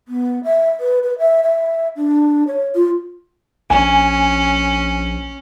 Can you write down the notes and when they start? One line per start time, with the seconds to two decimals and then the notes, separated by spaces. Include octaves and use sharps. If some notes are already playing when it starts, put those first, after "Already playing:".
0.08 B3
0.44 E5
0.80 B4
1.03 B4
1.19 E5
1.44 E5
1.96 D4
2.47 C#5
2.75 F4
3.70 A#1 C#4 G#5